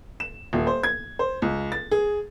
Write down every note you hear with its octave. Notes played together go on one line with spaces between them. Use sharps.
E7
D#1
C5
G#6
C5
C#2
A6
G#4